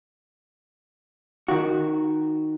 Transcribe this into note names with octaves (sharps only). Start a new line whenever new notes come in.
D#3 F#4